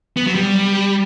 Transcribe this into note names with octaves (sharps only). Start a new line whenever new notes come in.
B3
F#3
G3